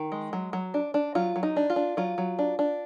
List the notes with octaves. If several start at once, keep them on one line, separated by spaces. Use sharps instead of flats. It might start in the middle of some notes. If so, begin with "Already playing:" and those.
Already playing: D#3
G#3
F#3
F#3
D4
D4
F#3 F4
F#3
D#4
D4
F4
D4
F#3 F4
F#3
D4
D4